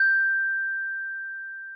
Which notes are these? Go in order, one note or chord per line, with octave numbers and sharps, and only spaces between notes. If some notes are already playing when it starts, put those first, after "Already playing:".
Already playing: G6